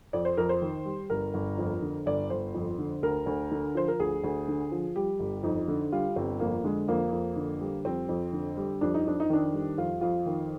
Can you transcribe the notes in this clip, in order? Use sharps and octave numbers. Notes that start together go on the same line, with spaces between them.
F2 D5
C5
F2 A#4
C5
D#3
G3
G1 A#4
G1
F2
D3
G1 D5
G1 C5
F2
D3
D2 A#4
D2
D3
F3 C5
A#4
D2 G#4
D2
D3
F3
G3 G4
G1
F2 D#4
D3
G3 F4
G1 C4
F2 A#3
D3 G#3
F2 A#3
F2
D3
G3
F2 C4
F2
D3
G3
F2 D4
D#4
F2 D4
D#4
D#3 D4
G3
F2 F4
F2 F4
D#3